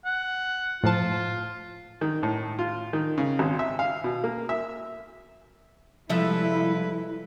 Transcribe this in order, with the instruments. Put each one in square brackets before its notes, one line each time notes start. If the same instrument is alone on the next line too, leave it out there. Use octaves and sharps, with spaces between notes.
[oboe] F#5
[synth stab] A2 F3 A5 [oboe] F4
[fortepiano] D#3
A2
F4
D#3
C#3
G#1
E5
F5
B2
A#3
E5
[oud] C3 F3 E5 [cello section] G3 G#3 E4 [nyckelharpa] A4 B4